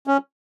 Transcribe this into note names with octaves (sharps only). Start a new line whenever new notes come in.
C#4